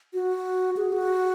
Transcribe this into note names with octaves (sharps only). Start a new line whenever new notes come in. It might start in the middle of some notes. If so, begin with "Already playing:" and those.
F#4
G#4
F#4